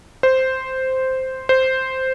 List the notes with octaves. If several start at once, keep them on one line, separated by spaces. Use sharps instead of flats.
C5
C5